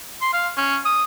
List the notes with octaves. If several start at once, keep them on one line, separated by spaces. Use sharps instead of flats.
C6
F5
C#4
D#6